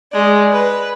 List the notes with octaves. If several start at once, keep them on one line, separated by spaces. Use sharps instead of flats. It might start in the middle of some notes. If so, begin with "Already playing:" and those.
G#3 D5
B4